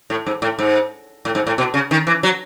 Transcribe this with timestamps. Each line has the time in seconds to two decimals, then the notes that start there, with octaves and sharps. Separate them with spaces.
0.10 A2
0.26 G#2
0.42 A2
0.59 G#2
1.25 A2
1.35 G#2
1.47 A2
1.58 B2
1.74 C#3
1.91 D#3
2.07 E3
2.23 F#3